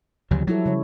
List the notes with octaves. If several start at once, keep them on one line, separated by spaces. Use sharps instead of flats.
D2 C#3 F3 F#3 G4
F#3 G3 E4 A4
C#3 G3 C#5